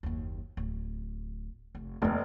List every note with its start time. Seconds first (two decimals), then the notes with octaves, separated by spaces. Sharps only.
0.03 F#1 D#2
0.57 D1
1.75 F1
2.02 F1 D#2 B3